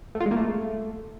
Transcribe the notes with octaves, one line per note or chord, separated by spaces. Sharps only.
A3
F4
G#3
A#3
A3